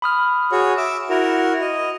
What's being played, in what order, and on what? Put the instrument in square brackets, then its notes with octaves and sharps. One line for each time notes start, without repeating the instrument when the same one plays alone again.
[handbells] B5 D#6 F6
[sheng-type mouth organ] F#4 G#4 C#5
E5 D6 E6
E4 F#4 A#4
D#5